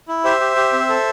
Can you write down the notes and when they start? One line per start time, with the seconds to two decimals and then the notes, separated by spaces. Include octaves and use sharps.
0.08 E4
0.25 G4 C5 E5
0.40 G4
0.56 G4
0.73 C4
0.89 A4